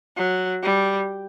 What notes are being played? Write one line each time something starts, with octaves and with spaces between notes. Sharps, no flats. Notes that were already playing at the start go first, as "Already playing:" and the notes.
F#3
G3